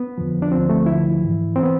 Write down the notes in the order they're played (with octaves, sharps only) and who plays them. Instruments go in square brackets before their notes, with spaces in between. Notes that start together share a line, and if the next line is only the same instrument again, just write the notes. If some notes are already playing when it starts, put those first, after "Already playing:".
Already playing: [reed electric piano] B3
F2 D3 F3
D4
D2 D3 F3 C4
A3
D2 D3 F3 E4
G#2 E3
E3 C4
B3